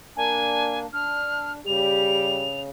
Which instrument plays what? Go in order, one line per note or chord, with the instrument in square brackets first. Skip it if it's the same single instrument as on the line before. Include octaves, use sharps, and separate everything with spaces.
[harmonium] A#3 D4 [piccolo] G#5
[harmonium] D4 [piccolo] F6
[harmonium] C#3 [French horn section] G3 G4 [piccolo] F7